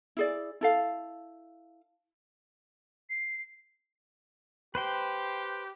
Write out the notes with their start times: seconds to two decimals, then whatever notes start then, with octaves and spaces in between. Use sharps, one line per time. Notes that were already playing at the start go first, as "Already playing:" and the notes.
0.17 E4 G#4 D5
0.61 E4 A4 F5
3.10 C7
4.75 G4 B4 C5 G5